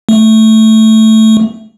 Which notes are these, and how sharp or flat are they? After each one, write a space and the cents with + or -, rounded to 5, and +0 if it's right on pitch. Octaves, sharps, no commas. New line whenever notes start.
A3 +0